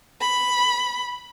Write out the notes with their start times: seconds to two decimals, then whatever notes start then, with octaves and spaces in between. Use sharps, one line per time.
0.21 B5